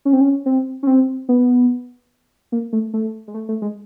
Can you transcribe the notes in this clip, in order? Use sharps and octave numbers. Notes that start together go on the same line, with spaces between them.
C#4
C4
C#4
C4
C#4
C4
B3
A#3
A3
A3
G#3
A3
A3
G#3